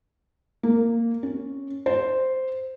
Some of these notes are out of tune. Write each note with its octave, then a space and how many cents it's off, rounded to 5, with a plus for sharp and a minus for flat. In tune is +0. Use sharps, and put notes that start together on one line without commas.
A#3 -10
C#4 -5
C5 -5